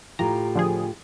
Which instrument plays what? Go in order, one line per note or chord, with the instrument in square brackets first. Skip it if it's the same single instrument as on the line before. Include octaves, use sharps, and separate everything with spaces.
[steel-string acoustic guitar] A2 F4 G4 [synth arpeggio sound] A#5
[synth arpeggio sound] D3 F3 G#4